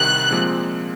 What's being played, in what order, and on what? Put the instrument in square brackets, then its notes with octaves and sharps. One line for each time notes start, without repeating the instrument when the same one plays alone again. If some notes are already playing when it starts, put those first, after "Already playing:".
Already playing: [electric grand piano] C2 C3 D#3 [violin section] F#6
[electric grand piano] A#2 F3 G#3 C4